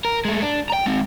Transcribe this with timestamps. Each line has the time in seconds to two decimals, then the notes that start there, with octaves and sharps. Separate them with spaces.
0.05 A#4
0.25 G#3 A3
0.42 D4
0.70 G5 A#5
0.86 G#3 C4